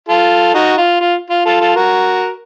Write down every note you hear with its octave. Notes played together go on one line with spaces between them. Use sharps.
F4 A4
D#4 F#4
F4
F4
F4
F4 A4
F4 A4
F#4 A#4